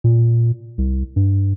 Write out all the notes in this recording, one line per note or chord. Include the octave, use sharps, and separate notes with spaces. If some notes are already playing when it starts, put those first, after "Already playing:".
A#2
C2
G2